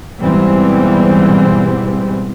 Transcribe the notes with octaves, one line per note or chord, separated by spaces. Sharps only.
G#2 B2 E3 G3 B3 C4